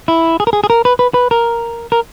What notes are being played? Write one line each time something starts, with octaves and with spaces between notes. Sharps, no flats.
E4
G#4
A#4
G#4
G#4
A#4
B4
B4
B4
A#4
A#4